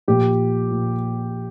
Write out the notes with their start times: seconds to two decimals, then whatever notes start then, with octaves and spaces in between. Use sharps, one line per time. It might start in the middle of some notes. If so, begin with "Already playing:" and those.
0.08 A#1 A#2 F3 G4
0.71 A#2